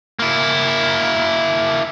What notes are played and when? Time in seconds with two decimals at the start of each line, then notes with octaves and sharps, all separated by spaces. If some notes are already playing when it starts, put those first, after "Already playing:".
0.19 A#3 E4